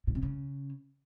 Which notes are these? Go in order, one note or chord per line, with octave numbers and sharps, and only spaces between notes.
A2
C3
C#3